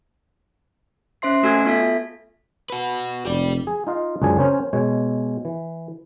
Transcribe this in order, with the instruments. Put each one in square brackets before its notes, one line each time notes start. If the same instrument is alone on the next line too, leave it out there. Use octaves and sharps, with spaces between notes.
[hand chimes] C#4 C5 E5 C6 C7
A3 F#4 A4 G#5 E6 G#6
B3 F4 A4 E5 B6
[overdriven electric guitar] F#4 B4
[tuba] F1 [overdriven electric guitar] G4 D5
[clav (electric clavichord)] G#4
D#4 F4 D#5 F5
C#2 F#2 D4 G#4 C5 G#5
C#4 A#4 C5 C#5
B2 G#3 C#5
E3